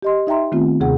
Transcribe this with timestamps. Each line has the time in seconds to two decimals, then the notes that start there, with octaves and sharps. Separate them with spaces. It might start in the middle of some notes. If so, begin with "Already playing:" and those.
0.02 G4 D#5 C6
0.27 D#4 E5 G5 A#5 C6
0.52 D#3 A3 B3 C4 F4
0.80 D#2 C3 G#4 F#5